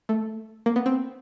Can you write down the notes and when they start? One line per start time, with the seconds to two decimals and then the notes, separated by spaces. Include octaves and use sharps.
0.09 A3
0.66 A#3
0.76 B3
0.86 C4